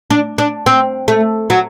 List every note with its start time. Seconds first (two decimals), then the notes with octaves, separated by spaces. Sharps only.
0.10 D4
0.38 D4
0.66 C4
1.08 A3
1.50 F#3